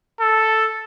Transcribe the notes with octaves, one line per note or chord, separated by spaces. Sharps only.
A4